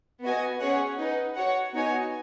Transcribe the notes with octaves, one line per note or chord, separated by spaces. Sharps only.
B3 F#4 D#5 G#5
C#4 G#4 C#5 F#5
D#4 B4 F#5
F#4 C#5 F#5
B3 D#4 F#4 C#5 G#5